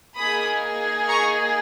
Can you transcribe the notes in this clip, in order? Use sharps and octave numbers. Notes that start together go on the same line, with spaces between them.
A#3 D#4 G#4 B5 D#6
A#5 C#6